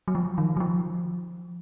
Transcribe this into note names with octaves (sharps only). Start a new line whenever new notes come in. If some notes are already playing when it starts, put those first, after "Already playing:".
F#3
F3
D#3
F#3
F3